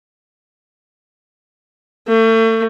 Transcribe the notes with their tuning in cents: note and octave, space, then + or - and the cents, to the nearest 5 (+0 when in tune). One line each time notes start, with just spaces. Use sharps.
A3 +35